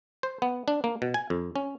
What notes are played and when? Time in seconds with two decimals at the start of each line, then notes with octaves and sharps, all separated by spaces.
0.23 C5
0.42 B3
0.68 D4
0.84 A#3
1.02 B2
1.14 G#5
1.30 F2
1.56 C#4